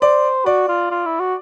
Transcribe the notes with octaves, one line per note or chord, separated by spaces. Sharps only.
C5 D5
F#4 D5
F4
F4
E4
F#4